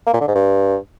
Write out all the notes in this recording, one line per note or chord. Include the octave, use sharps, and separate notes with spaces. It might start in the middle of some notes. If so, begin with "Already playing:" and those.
A#3
A#2
D3
G#2
G2